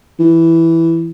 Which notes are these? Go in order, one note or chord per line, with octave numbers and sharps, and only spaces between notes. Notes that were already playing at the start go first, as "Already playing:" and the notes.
E3